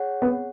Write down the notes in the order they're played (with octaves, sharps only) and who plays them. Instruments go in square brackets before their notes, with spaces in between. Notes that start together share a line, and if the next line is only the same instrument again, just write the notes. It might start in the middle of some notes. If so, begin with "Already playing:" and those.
Already playing: [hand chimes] G#4 C#5 F#5
[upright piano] B3